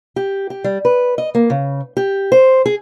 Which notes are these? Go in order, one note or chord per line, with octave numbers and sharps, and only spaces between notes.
G4
G4
G3
B4
D#5
A#3
C#3
G4
C5
G#4